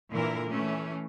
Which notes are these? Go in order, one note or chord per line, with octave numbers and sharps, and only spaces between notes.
A#2 D3 E3 E4 A#4
E3 A3 C#4